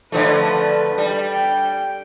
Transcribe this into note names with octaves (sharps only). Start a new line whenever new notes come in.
D3 F3 A3 B4
G3
G5